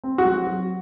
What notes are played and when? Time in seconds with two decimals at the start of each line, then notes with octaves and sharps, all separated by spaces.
0.04 C4
0.18 F#4
0.25 F#3
0.47 F#4